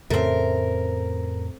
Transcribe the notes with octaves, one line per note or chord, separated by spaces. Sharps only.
F2 A2 C#3 A3 C4 A#4